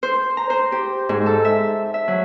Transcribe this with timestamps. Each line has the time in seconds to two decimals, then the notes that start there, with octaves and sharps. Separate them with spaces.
0.03 C5
0.37 A#5
0.50 C5
0.72 G4
1.09 G#2
1.26 A4
1.45 E5
1.94 E5
2.08 F#3